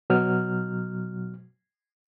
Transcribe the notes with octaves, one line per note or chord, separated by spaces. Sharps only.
B2 F#3 F6